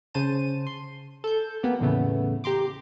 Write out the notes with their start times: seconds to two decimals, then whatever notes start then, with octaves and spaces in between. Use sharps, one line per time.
0.14 C#3 C5 A5 D#7
0.67 C6
1.24 A4 G6
1.63 A#3 B3 G4
1.80 E2 A2 C#3 A3 B3
2.44 G4 A#5 C6 D6